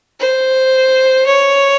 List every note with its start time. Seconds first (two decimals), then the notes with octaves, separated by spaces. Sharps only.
0.20 C5
1.26 C#5